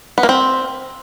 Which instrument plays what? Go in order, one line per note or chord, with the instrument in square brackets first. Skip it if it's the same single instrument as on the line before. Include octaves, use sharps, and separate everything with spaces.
[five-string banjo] B3
A#3
C4